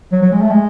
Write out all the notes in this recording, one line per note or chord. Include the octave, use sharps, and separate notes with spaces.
F#3
F#3
G#3
A3
G#3